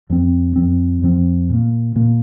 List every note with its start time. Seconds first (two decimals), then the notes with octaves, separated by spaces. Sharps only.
0.10 F2 F3 C4
0.56 F2 F3 C4
1.02 F2 F3 C4
1.50 A#2 A#3
1.96 A#2 A#3